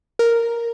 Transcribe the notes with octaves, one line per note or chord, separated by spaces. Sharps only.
A#4